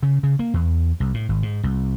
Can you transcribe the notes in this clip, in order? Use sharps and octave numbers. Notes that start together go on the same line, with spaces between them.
C#3
C#3
A#3
E2
C2
A2
G#1
G#2
C2